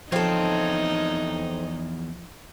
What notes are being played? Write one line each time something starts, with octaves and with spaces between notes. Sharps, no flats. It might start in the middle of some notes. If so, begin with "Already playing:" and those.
E2 F3 C4 D#4 A4 C#5 F5